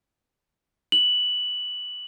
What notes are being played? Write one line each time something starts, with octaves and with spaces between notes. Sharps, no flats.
F#7